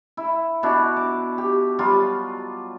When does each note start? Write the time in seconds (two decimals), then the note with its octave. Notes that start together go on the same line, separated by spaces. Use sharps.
0.17 E4
0.63 B2 D4 E4 F#4
0.96 D6
1.38 G4
1.79 F#3 G3 F4